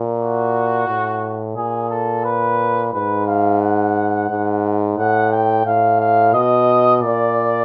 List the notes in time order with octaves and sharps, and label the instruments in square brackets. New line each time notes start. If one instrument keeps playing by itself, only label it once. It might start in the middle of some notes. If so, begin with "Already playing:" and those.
Already playing: [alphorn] A#2
[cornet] F#4
[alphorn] A2
[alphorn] A#2 [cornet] G#4
[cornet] A4
B4
[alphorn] G#2 [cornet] B4
[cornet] F5
F#5
[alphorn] G#2
[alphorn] A2 [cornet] F#5
[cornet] G5
[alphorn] A2 [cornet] F5
[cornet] F5
[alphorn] B2 [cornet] D#5
[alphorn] A#2 [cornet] D5